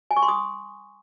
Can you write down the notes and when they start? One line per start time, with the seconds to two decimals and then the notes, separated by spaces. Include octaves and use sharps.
0.11 G#5
0.17 C#6
0.22 C6
0.28 D#6